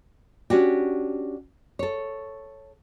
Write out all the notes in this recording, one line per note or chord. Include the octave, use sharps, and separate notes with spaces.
C#4 D4 F#4 G4
A4 C#5